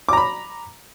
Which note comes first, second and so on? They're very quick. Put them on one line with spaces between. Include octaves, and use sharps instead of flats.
D6 A#5 B5